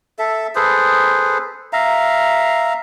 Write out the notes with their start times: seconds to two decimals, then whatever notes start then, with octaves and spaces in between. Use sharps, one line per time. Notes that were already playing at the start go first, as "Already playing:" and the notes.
0.19 A4 E5
0.55 G#4 A4 B4 C5
1.73 E5 F5 A#5